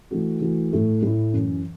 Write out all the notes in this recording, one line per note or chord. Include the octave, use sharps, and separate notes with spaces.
E3 A3 F#4
E3 A3 F#4
A2 A3 E4
A2 A3 E4
F#2 E3 C#4